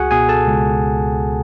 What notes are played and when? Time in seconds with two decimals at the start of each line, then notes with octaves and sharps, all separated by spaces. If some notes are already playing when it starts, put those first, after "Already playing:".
Already playing: C#2 F#4 G#4 F#5 G#5
0.11 B2 G#4 G#5
0.29 A4 A5
0.47 C#2